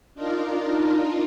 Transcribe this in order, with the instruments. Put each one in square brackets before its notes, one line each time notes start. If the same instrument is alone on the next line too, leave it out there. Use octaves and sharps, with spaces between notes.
[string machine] D4 D#4 F4 A#4